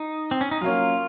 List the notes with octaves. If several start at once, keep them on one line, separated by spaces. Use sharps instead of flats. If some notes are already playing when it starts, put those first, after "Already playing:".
Already playing: D#4
C4
C#4
D#4
F#3 A#3 C#4 F4